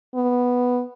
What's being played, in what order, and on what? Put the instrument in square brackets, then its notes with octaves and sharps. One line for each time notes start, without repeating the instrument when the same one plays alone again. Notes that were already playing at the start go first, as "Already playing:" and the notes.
[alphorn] B3